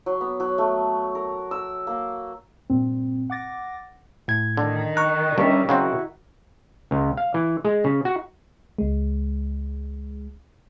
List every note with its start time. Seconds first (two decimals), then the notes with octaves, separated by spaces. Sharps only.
0.06 F#3
0.21 B3
0.40 F#3
0.58 A3
1.15 A#4
1.51 E6
1.87 A#3
2.70 G2 A#2 C4
3.30 F#5 D6 A6 A#6
4.28 A2 G#6
4.57 D3 D#3
4.97 A#5 C#6 F#6
5.38 G2 G3 C#4 E5
5.69 C#3 F#3 C4 E4 F#4
6.91 C#2
7.17 F5
7.34 E3
7.65 G#3
7.84 C#3
8.05 F#4
8.78 C#2 G#3